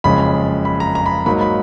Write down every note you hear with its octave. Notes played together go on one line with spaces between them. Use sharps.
F#1 F2 C#3 G#3 B5
B5
A#5
A#5
B5
G#2 F#3 A#3 D#4 B5
B5